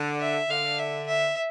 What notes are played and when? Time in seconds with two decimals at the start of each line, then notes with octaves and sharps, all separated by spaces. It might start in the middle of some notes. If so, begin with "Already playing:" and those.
Already playing: D3
0.21 E5
0.49 D3 F5
0.79 E5
1.07 E5